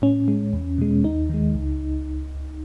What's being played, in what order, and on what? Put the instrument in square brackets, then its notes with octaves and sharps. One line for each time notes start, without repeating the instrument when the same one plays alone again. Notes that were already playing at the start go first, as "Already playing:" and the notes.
[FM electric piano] A2 C#4
G#3
E2
B2 G#3
D#2 D#4
D#3 G#3
C#2